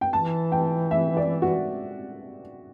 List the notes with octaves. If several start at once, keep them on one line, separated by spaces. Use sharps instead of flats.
G5
E3 A5
G5
E5
D5
F#4